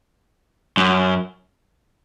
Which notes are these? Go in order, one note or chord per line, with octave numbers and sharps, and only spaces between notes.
F#2